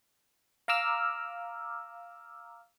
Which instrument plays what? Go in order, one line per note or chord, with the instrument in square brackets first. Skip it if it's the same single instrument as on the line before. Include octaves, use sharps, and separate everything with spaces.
[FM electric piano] F5 A#5 D6 E6 F6